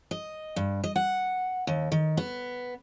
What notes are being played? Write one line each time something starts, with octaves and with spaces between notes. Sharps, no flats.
D#5
G2
D#5
F#5
D#2
D#3
B3